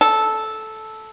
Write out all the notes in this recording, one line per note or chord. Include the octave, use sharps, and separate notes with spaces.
A4